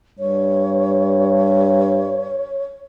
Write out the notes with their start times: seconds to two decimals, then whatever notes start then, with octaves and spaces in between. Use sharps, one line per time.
0.19 G2 C#5